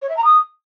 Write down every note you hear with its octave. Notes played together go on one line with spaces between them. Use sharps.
C#5
E5
A#5
D#6